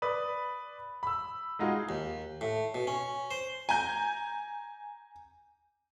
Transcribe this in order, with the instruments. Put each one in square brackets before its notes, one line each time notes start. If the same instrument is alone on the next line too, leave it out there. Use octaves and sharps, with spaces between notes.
[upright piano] B4 D5 D#6
B5 E6
G#3 D#4 F4 F#4 G#4
[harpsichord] D#2
A2
B2
C#4
C5
[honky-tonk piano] G#5 A#5 G6